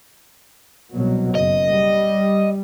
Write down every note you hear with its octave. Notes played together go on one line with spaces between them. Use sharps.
C2 B2 F#3
F#1 D#5
G3